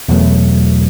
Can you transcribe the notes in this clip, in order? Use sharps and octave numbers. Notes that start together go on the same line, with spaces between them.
E2 B2 F#3 A3